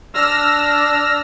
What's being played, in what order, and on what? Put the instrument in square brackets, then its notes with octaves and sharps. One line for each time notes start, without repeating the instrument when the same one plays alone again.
[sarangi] D4 [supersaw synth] E6 F6 A#6